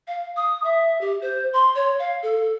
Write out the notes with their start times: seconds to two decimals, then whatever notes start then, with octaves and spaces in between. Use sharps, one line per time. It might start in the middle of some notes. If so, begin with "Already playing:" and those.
0.08 F5
0.36 D#6
0.64 E5
1.01 G4
1.22 C5
1.53 C6
1.75 C#5
1.99 F5
2.23 A4